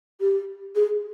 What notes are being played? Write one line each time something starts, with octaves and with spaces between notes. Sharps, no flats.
G4
G#4